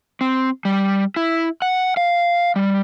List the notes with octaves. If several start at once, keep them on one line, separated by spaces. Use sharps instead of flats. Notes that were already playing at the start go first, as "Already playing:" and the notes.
C4
G3
E4
F#5
F5
G3